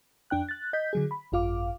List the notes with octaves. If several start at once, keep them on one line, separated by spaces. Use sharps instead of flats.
F2 D4 G5 F#6
F#6 A6
D#5 G6 B6
D3 F#3 G#4
B5
G#1 F#2 F4 F5 D6